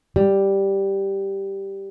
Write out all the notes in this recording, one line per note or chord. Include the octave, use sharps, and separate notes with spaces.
G3